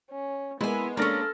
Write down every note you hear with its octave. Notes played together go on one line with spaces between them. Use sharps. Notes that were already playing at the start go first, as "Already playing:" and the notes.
C#4
G#3 A#3 B3 E4 G#5
G#3 A#3 C#4 D4 A4 F6 A#6